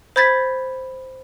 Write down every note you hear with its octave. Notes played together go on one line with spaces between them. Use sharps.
C5 B5 G#6 A6 B6